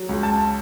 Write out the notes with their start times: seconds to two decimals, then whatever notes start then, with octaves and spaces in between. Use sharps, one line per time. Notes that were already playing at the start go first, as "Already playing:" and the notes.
Already playing: F#3
0.09 C#2
0.23 A5